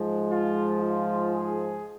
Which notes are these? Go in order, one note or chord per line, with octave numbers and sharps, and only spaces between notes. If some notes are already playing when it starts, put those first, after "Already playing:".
Already playing: G#2 F3 G#3
F4
F4
G#4